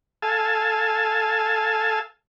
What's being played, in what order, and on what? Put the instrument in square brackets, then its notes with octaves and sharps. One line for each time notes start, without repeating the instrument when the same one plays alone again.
[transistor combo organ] A4 F5 G#5 A5